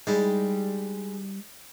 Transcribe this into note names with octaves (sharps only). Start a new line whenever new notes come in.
G3 G#3 D#4 E4